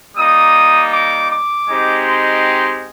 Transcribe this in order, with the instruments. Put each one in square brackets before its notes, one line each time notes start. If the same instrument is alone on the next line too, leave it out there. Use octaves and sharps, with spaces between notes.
[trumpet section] G3 A#3 D#4 D#6
D6
D6
G#3 C4 D#4 G4
C6